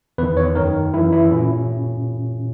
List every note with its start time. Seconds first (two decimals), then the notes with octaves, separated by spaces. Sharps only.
0.18 E2 B4
0.23 D#3
0.37 C#5
0.55 D#3 A#4
0.59 F#2
0.93 F#2 E4
0.97 E3
1.12 E4
1.31 A#2 C#4